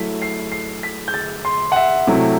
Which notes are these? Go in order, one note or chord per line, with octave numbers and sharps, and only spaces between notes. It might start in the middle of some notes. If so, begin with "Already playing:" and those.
Already playing: F#3 A3 E4 B6
C7
C7
B6
G6
A6
C6
F#5
E5
C3 F#3 A3 E4